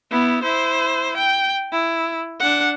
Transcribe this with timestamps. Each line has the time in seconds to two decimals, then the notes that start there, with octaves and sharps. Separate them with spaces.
0.11 B3 E4
0.43 E4 C5
1.17 G5
1.72 E4
2.40 D4 F#5